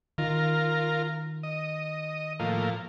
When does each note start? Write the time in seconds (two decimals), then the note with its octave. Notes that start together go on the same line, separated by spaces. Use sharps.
0.18 D#3 F4 A#4
1.43 D#5
2.40 A2 F3 A#3